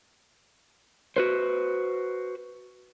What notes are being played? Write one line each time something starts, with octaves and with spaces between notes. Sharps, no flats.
F#4 B4 C5